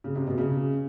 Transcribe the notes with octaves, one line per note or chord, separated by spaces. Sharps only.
C#3
C3
B2
C#3